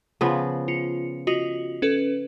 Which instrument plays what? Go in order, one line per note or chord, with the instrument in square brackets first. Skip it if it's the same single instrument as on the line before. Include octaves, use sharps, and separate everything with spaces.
[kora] C#3 F3 B3
[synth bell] F4 C#7
[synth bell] F4 F#4 [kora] D#5
[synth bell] C#4 A4 B4